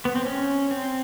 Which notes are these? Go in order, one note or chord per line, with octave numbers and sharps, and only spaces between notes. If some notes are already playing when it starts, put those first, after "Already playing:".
B3
C4
C#4
C4